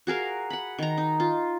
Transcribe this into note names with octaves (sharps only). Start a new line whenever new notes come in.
F#4 G#4 A#4 F5
F#5 B5
D#3 A#5
D#4
F4